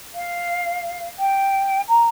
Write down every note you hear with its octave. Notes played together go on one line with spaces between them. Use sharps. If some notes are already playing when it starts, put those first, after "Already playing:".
F5
G5
A#5